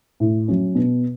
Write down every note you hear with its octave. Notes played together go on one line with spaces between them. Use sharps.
A2
F#3 C#4
B2